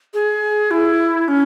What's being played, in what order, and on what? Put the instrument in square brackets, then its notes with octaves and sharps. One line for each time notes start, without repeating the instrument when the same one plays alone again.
[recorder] G#4
E4
C#4